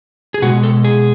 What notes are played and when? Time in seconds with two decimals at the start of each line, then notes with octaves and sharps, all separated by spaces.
0.34 G#4
0.42 B2 G#3 F#4
0.63 A4
0.84 G#4